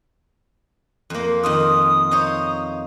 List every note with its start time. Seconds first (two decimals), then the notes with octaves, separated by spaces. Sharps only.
1.10 F2 A#3
1.43 F2 D#3 F4 D#6
2.11 D#4 C5 C#5